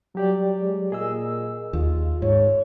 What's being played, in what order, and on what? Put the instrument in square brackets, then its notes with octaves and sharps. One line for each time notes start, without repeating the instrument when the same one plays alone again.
[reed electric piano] F#3 G4 D5 [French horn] G3
[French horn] G#3
[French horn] A#2 [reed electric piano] G#4 D#5 E6
[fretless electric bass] D#2 [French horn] F4
[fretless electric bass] G#2 [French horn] C#5